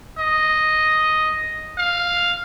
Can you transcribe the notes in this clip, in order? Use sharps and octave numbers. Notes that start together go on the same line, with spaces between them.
D#5
F5